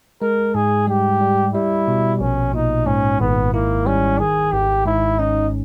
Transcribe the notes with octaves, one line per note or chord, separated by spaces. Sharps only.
G#3 A#4
G#2 G#4
G3 G4
G3
G3 E4
B2
A#1 C#4
A#2 D#4
G#2 C#4
G#1 B3
A#3 E4
G3 C#4
D#3 G#4
G#1 G4
G#2 E4
C#4 D#4